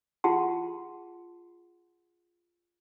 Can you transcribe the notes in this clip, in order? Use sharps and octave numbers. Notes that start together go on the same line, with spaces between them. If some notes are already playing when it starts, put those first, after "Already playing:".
F4 G#4 F#5 A5 C6